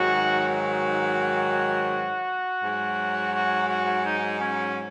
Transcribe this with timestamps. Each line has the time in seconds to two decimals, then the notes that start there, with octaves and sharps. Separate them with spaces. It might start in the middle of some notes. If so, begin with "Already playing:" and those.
Already playing: G#2 D#3 F#3 F#4
0.48 F#4
2.62 G#2 F#3
3.33 F#4
3.68 F#4
4.04 D#4
4.39 C#4